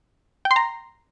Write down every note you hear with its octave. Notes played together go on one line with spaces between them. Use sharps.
G5
C6
A#5